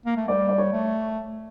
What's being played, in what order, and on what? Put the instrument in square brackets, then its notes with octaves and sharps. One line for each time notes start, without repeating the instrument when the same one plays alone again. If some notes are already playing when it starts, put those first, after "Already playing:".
[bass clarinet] A#3
A3
[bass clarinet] G3 [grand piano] D5
[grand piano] D5
C#5
[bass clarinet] A3